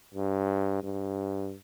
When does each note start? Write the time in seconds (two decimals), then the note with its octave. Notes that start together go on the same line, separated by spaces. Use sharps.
0.14 G2
0.83 G2